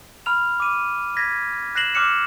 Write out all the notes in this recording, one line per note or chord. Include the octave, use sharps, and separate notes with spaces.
B5 F6 F7
D6 D#7
G#6 A#6 B6
F#6 A#6 C7 E7 F#7
D6 F6 F#6 C#7 E7